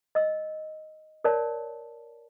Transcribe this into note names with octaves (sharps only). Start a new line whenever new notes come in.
D#5 E6
A#4 C#5 D5 A5